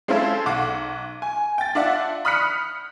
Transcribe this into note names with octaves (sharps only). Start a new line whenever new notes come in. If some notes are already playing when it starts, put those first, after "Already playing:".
G#3 C4 C#4 E4 F4 A4
B1 F#5 D6
G#5
G5 A6
D4 F4 D5 E5 F#5
B5 D#6 F6 F#6 B6 C#7